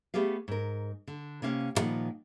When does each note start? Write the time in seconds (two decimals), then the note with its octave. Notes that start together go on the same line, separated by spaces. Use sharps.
0.14 A3 B3 G4 G#4 F5
0.48 G#2 A#4
1.07 D3
1.42 C3 A#3 C#4 F5
1.75 F2 A#2 D#3 F3 F#5